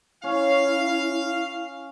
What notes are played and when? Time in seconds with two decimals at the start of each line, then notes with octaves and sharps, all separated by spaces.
0.24 C#4 E4 F5